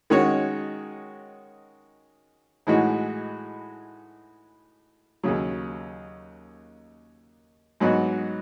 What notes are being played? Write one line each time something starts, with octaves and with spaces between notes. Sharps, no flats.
D#3 G#3 C#4 F#4 C#5
A2 E3 G#3 D#4 F#4
D#2 C#3 F#3
G#2 F#3 B3 D#4 F#4